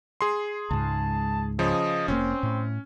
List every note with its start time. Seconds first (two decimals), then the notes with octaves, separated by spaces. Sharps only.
0.21 G#4 C6
0.71 C#2 G#2 A5
1.59 C#3 F3 D#5
2.08 F1 G#2 A#3 C4 C#4
2.43 A2